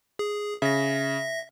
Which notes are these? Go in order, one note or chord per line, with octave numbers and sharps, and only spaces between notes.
G#4
C#3 E5 A#6